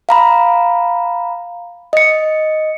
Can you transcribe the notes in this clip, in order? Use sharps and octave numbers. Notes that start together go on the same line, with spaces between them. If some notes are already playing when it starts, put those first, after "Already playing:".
F5 A#5 B5
D#5 C#7